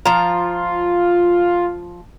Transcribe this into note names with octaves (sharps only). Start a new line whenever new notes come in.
F3 F4 A#5